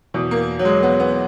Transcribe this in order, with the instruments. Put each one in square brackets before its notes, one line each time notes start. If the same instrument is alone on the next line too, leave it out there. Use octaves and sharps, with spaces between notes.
[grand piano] E2 B2
A#3
F#3
G#3
B3
B3